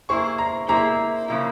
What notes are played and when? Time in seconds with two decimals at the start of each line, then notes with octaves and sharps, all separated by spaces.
0.09 A#3 E4 G#4 C5 C#6
0.38 A#5
0.68 A#3 E4 G#4 C5 A#5
1.28 C#3 F3 A#3 E4